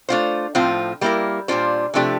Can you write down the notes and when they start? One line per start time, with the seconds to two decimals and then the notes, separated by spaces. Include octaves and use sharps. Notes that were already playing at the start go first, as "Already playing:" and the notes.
0.09 A3 D4 F4 C5
0.55 A2 F3 C4 F4
1.01 G3 A#3 E4 A#4
1.48 A#2 G3 D4 F4 C5
1.94 C3 F3 A3 D4 G4